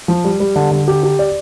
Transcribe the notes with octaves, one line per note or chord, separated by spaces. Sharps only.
F3
G3
G3
D3
D3
G4
G4
D5